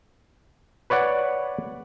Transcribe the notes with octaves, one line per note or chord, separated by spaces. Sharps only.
B4 C#5 D5 F#5